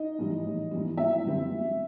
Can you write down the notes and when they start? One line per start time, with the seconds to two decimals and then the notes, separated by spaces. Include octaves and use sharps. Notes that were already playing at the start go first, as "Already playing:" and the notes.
Already playing: D#4 D#5
0.19 G#2 E3 G3
0.45 A1
0.71 G#2 E3 G3
0.97 G#1 E4 E5
1.24 F#2 D3 G3 C4
1.50 G#1